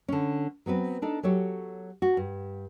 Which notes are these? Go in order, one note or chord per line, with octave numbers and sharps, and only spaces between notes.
D3 C#4
F#3 B3 C4 B4
D4 D#4 A4
F#3 G4 A4 C#5
F#4
G2